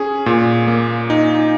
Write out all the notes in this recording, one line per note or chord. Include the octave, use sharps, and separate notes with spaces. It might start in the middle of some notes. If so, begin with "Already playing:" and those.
Already playing: C#4 G#4
A#2
A#3
D#4